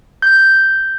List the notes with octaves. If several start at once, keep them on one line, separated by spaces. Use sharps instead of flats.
G6